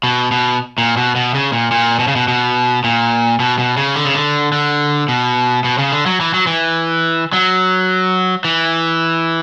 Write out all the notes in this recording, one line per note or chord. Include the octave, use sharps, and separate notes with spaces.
B2
B2
A#2
B2
B2
C#3
A#2
A#2
B2
C#3
B2
B2
A#2
B2
B2
C#3
D3
C#3
D3
D3
B2
B2
C#3
D3
F#3
E3
F#3
E3
F#3
E3